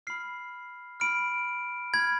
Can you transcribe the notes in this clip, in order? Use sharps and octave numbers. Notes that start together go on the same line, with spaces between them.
B5 F6 C7
B5 F6 D7
B5 G#6
F6